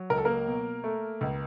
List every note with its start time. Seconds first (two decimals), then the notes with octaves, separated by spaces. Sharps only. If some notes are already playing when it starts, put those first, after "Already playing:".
Already playing: F#3
0.10 C#2 A#4
0.17 A4
0.25 A#3 A#4
0.47 B2
0.84 A3
1.21 C#2